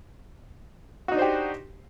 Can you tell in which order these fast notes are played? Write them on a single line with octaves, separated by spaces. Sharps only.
F#4 D#4 D4 C5 G4